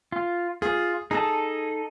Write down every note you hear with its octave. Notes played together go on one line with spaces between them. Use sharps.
F4
F4 G#4
D#4 G#4 A4 A5